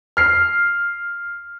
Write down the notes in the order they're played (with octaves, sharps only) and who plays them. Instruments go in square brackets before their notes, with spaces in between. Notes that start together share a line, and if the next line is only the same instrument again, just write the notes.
[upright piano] F6 C7